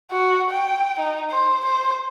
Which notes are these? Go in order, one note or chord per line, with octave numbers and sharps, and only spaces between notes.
F#4
G5
D#4
C5
C5